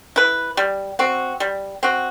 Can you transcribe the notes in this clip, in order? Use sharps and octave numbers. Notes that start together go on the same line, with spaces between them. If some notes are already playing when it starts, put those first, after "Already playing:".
E4 B4
G3
C4 F#4
G3
C4 F#4